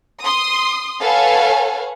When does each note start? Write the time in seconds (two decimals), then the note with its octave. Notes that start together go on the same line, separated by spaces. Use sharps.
0.23 C6 D#6
1.01 A4 B4 C#5 F5 F#5 G#5